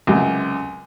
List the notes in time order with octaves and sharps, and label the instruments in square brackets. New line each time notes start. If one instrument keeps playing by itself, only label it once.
[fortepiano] C#2 F#2 C3